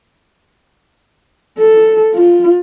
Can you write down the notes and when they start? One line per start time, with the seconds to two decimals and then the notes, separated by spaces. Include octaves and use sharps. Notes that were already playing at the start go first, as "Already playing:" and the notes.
1.58 A4
2.15 F4